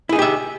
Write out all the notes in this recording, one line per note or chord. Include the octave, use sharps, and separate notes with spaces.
D#4 E4 G4 G#4 E5